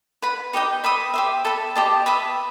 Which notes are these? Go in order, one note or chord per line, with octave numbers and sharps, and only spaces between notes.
B4 F#5 B5
D#4 G4 D#5 G5
B4 E5 B5 D#6
G4 C5 E5
A4 E5 B5
G4 C5 D#5 A5
B4 E5 B5 D#6